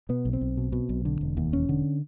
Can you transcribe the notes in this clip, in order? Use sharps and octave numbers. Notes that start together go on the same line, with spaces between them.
B2 B3
B1
C4
B1
B2
B2
B1
D3
E1
D#2
E1 C#4
D3